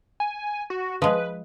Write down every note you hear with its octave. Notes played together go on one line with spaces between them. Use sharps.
G#5
F#4
F3 G#3 B4